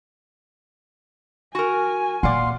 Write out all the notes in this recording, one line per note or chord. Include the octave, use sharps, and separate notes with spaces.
F#4 A#4 G#5
A#2 D5 F5 F#5 C6